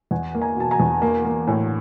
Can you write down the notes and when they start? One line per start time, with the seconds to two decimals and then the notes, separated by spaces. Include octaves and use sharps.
0.11 E2 F#5 G#5
0.35 A#3
0.41 G#5 A#5
0.56 B2 A5
0.71 G#5 A#5
0.80 E2
1.02 A#3
1.25 A#3
1.47 A2